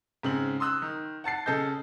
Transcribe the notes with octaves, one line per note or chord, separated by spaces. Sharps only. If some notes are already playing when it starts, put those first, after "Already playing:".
G#2 C#3 C4 F#7
C6 D#6 E6 F#6
D#3
F#5 A5 A6 C7
C#3 A4 D#5 G6